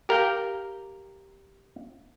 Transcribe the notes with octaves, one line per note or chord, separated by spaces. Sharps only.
G4 A#4 F5 G5